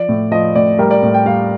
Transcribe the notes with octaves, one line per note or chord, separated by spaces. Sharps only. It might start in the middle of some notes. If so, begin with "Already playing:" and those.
Already playing: F3 D5
A2
F3 D#5
A2 D5
G3 A#4
D5
A2
G5
G3 F5